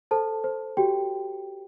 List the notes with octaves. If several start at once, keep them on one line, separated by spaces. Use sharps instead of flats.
A4 C5 A5
C5
F#4 G4 G5